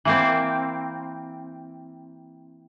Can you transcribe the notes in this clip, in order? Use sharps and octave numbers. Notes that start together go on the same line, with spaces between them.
E3 A#3 C4